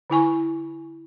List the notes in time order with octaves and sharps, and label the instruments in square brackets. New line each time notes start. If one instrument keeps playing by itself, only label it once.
[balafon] D3 E4 G#5 C#6